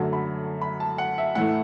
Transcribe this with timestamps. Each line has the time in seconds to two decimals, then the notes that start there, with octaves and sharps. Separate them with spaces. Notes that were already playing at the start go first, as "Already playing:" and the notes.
Already playing: F#2 D3 F#3 A3 A5
0.13 B5
0.61 B5
0.80 A5
0.98 F#5
1.18 E5
1.35 A2 E3 A3 F#5